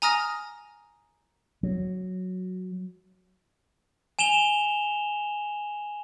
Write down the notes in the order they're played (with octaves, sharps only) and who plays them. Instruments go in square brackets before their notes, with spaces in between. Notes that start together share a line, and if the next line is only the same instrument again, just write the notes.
[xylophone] G#5 A#5 D#6 F6 A#6
[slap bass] F#3
[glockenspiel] G#5 E7 F7 G7